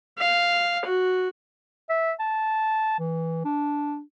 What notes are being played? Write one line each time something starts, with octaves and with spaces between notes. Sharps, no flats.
F5
F#4
E5
A5
E3
D4